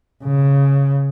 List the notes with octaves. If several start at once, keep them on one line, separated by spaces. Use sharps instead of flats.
C#3